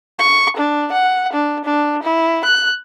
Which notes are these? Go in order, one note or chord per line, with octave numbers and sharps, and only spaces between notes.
C#6
D4
F#5
D4
D4
E4
F#6